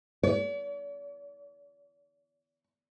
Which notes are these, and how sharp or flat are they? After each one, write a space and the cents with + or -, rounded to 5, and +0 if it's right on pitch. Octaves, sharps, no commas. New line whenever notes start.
D5 -45